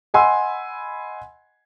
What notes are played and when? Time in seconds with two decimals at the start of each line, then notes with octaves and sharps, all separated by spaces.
0.14 D#5 F#5 G#5 B5 C6 E6